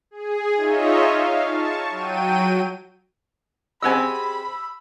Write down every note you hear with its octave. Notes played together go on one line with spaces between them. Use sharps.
G#4
D#4 F4 C#5 D#5 E5
F5
A5 C#6
F#3 G5 D#7
C4 G4 G#4 D#5 F#5 G#5 B5 E6